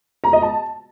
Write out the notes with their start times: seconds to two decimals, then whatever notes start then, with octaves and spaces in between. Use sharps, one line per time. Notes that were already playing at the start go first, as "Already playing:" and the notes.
0.24 A#5
0.33 D#5
0.42 A5